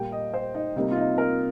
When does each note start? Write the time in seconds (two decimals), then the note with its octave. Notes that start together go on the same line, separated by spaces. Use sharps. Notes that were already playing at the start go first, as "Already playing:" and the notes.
Already playing: A#2 G3 A#3 G5
0.12 D#5
0.34 C5
0.54 D#4
0.76 C3 G3 A#3 D#4
0.91 F4
0.97 D#4
1.18 A#4